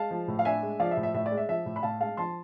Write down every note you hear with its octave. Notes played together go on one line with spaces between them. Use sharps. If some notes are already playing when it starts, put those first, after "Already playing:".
Already playing: G#3 F5 A5
F3
A2
F5
D4 E5 G#5
G#3
F3 D5 F5
E5
A2
E5
A2 E5
D5
G#3
E5
F3 E5
A2
B5
A2 F5 A5
G#3 F5 A5
F3 A5 C6